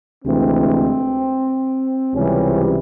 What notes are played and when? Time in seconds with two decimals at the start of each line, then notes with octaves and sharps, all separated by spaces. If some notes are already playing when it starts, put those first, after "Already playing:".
0.24 D2 C3 E3 G#3 C4
2.13 C#2 C3 E3 G3 C#4